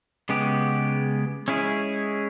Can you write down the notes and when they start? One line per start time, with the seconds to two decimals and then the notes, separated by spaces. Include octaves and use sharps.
0.29 C#3 G#3 B3 G4
1.48 G#3 C#4 E4 G#4